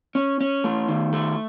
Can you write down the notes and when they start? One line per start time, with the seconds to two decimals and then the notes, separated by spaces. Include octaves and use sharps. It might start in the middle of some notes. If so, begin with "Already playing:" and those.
0.15 C#4
0.41 C#4
0.64 A3
0.88 D#3
1.13 A3